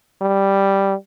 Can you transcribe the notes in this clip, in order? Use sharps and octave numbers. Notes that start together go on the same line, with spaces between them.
G3